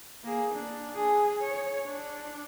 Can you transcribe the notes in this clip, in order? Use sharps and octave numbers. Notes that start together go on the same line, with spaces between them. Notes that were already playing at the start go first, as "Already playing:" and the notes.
A#3 G#4
D4
G#4
C#5
D4